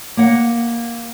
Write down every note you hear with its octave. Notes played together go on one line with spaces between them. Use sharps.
A#3 F#5